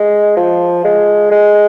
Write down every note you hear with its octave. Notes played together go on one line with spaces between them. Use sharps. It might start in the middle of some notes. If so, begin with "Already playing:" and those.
Already playing: G#3
F3
G#3
G#3